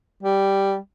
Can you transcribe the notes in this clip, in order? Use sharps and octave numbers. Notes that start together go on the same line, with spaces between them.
G3